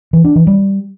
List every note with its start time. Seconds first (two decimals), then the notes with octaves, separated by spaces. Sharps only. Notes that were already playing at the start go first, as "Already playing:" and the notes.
0.13 E3
0.24 D4
0.36 E3
0.47 G3